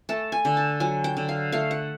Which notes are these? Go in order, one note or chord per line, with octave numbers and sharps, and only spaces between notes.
A3 A5
G#5
D3
A5
F#3 G#5
G5
D3
F5
A3 F5
F#5